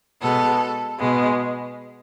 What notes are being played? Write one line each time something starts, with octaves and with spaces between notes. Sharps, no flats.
B2 G#3 B3 A4
B2 G#3 B3